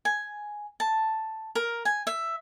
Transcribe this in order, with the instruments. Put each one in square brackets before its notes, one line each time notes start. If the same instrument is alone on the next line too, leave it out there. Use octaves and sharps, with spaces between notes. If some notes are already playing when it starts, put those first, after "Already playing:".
[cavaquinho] G#5
A5
A#4
G#5
E5